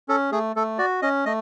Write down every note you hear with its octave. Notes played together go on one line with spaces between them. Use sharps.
C#4 A4
A3 G#4
A3 A4
F#4 D5
C#4 D#5
A3 D#5